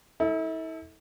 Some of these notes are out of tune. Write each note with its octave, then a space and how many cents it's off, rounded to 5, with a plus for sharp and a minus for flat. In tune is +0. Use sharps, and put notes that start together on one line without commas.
E4 -40 A4 +5